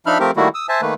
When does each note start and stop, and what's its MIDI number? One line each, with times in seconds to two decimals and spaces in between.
0.06 0.18 53
0.06 0.18 62
0.06 0.18 63
0.06 0.18 76
0.06 0.18 83
0.06 0.18 89
0.20 0.31 53
0.20 0.31 57
0.20 0.31 60
0.20 0.31 67
0.20 0.31 70
0.37 0.48 51
0.37 0.48 55
0.37 0.48 57
0.37 0.48 58
0.37 0.48 64
0.37 0.48 66
0.55 0.67 87
0.55 0.67 88
0.69 0.81 72
0.69 0.81 76
0.69 0.81 80
0.69 0.81 81
0.82 0.94 51
0.82 0.94 57
0.82 0.94 58
0.82 0.94 71